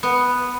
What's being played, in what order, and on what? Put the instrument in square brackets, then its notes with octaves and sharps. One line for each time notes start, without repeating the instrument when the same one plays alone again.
[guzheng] B3